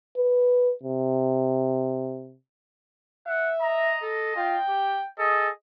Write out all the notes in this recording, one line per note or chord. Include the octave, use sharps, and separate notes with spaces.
B4
C3
E5 F#5
D#5 A#5
A4
F4 G5
G4
G#4 A4 D#5